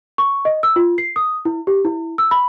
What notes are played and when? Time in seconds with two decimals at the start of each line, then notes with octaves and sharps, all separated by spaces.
0.18 C#6
0.45 D#5
0.63 E6
0.76 F4
0.98 C7
1.16 D#6
1.45 E4
1.67 G4
1.85 E4
2.18 E6
2.31 B5